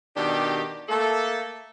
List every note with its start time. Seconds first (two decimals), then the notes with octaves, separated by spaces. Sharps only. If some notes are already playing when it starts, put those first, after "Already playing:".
0.16 B2 D#3 D4 G4
0.89 A3 A#3 A4